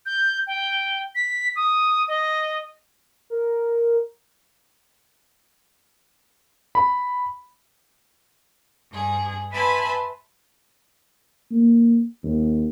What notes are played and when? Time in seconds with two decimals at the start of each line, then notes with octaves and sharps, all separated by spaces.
0.06 G6
0.47 G5
1.15 B6
1.56 D#6
2.08 D#5
3.30 A#4
6.75 B5
8.90 G2 G#4
9.51 B4 E5 G#5 A5 B5 C6
11.51 A#3
12.23 D#2